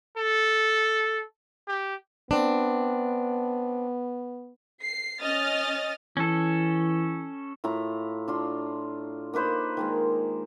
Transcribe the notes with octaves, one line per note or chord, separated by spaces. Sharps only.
A4
G4
B3 C4 D4
C7
C#4 D#5 D#6 F6 A6
E3 C#4 A4
A2 E4 F4 A#5
D4 F4 C6
A#3 D#4 B4 C5
D#3 G#3 A#3